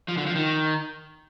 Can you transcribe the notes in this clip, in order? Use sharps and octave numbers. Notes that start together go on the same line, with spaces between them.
F3
D3
F3
D#3